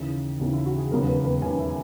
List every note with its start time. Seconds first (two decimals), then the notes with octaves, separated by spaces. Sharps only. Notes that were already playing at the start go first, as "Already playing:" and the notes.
Already playing: D#2 C#3 E3
0.39 D#2 C#3 E3
0.53 E4
0.66 F#4
0.78 G#4
0.91 E1 D#2 C#3 F#3 B3 A#4
1.07 B4
1.25 B4
1.41 E1 D#2 C#3 F#3 B3 G#5
1.59 E5